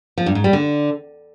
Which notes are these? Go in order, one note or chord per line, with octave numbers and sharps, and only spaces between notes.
F3
G2
G#2
G3
D3